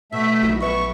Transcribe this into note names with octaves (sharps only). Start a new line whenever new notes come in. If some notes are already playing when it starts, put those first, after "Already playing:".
B2 A3 E5
A#1 F#3 D#4 E4 F#4
B3 B4 E5 C#6